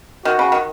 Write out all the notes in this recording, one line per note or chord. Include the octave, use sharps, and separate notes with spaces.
D#3 F#4
C#3
D#3